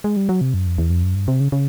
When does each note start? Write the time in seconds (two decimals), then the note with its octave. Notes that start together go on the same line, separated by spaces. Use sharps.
0.04 G#3
0.17 G3
0.29 F#3
0.41 C3
0.54 F#2
0.66 F2
0.78 E2
0.90 F2
1.04 F#2
1.15 G2
1.28 C3
1.40 C#3
1.52 C#3